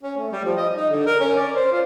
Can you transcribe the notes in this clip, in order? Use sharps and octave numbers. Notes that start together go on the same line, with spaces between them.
C#4
A3
G3
F3
D#5
D#4
D3
A#4
C#4
D5
C5
F4